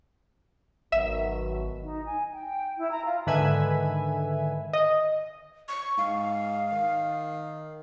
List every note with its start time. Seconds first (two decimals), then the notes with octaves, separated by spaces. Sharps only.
0.92 G#1 B2 D#3 F#3 E5 E7
1.84 D#4
2.06 G#5
2.32 G5
2.78 E4
2.90 A#5
3.06 F4
3.27 G#2 D3 D#3 B4 E5 G#5
4.73 D#5
5.68 C#6
5.98 G#2 F5
6.72 D#3